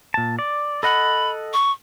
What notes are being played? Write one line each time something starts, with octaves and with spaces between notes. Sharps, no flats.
A#2 A5
D5
A4 D#5 F#5 B5
C#6